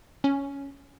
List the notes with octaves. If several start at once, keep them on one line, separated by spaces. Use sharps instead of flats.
C#4